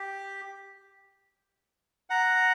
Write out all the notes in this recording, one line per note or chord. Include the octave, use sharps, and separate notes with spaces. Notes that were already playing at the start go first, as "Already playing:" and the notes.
Already playing: G4
F#5 A#5